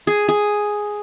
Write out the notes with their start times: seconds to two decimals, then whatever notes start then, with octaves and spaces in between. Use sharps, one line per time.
0.07 G#4
0.28 G#4